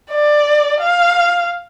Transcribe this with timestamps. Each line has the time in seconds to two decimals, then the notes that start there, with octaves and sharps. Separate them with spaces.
0.11 D5
0.81 F5